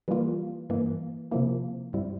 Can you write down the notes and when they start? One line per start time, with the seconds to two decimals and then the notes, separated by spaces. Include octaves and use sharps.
0.08 E3 G3 A#3 F4
0.70 G2 E3 A#3
1.31 C3 F3 A#3 E4
1.93 G2 G3 C4 E4